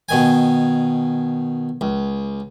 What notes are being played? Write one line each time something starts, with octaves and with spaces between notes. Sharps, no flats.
B2 D#3 G#5
C#2